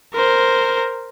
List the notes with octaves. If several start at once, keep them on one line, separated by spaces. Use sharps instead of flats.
A#4 C5